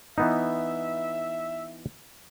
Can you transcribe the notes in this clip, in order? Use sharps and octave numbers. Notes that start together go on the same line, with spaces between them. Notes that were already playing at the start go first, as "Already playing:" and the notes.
E3 B3 D#4 E5